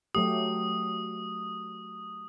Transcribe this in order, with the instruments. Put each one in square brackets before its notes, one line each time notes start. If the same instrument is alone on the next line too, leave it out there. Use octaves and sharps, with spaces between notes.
[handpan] F#3 A3 G4 [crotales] D#6